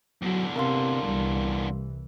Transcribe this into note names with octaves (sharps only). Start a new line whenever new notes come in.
E2 D3 F#3
C3 A#4 F5 C6
C2 E3 G3